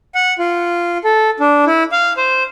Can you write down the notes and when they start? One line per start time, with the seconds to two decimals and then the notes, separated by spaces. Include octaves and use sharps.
0.15 F#5
0.39 F4
1.04 A4
1.40 D4
1.67 E4
1.92 F5
2.17 C5